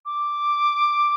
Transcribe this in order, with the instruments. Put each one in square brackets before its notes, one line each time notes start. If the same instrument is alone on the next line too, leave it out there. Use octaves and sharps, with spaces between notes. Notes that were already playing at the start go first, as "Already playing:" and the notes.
[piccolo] D6